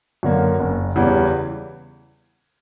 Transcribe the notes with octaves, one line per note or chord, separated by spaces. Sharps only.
F#2 D3 A#3
F#1
E2 C#3 E3 G3